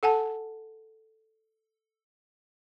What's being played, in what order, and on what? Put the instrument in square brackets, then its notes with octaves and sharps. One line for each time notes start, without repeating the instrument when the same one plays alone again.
[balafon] A4 F#5 G#5 A5